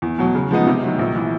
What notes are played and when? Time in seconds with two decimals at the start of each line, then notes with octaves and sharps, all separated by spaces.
0.02 E2
0.18 B2 F#3
0.35 C#3
0.51 F3 G#3 B3 D#4
0.67 C3
0.83 D#3 F#3
0.99 A#1
1.15 E3